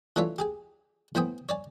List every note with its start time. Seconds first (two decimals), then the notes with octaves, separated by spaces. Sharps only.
0.16 E3 A3 D4 F4 C#5 E5
0.39 G4 G#4 G#5
1.15 A2 B3 C5 G5 G#5 D#6
1.49 C#5 D5 G#5